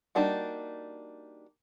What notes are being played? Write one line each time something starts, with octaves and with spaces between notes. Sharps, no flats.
G3 A#3 D4 D#4 F#4